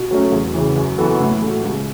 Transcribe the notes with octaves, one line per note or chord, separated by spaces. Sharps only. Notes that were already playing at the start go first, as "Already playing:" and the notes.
Already playing: B2
F#3 A3 C#4
E2
C#3 E3
F#2
E3 B3 F#4 A4
A2
A3 F#4
C#2